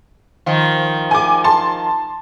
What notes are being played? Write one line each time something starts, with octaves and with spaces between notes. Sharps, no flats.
D#3 F3
G#5 D6
A5 C6